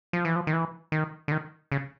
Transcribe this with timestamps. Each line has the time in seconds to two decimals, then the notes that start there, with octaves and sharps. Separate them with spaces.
0.13 F3
0.25 E3
0.36 F3
0.47 D#3
0.53 E3
0.92 D#3
1.28 D3
1.32 D#3
1.72 C#3